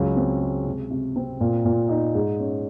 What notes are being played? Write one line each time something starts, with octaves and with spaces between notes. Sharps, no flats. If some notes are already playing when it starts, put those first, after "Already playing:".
Already playing: C#2 F#3
C4
G#3
C3
C3
C4
A#2
A#2
D#4
G#2
C#4